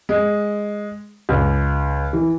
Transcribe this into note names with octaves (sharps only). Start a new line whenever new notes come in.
G#3
C#2
E3